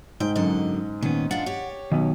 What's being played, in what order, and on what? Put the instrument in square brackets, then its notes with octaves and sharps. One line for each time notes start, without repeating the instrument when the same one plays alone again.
[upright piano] G#2 [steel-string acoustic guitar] G5
[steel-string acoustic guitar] F#2 D3 D#5
[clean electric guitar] A#2 D#3 B3 [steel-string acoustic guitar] C#4
[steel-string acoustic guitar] D4 F4 [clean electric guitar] F#5
[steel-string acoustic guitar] G4 C#5
[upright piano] B1 [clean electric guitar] D#3 B3